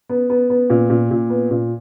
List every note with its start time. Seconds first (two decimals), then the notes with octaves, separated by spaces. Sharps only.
0.09 B3
0.30 B3
0.50 B3
0.70 A#2
0.90 A#2
1.11 A#2
1.30 B3
1.50 A#2